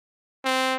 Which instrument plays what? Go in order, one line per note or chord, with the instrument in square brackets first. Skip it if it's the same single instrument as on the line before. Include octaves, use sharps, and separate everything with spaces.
[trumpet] C4